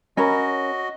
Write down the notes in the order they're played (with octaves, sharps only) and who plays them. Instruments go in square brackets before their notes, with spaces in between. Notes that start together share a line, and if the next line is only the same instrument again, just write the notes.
[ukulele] C#4 A#4 B5 [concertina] F#4 D#5